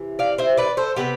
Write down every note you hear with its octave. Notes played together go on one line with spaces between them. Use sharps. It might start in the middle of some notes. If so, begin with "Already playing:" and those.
Already playing: C3 E3
D5 F5
C5 E5
B4 D5
A4 C5
C3 F3 B3 G4 B4